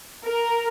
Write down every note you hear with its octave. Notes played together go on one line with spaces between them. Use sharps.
A#4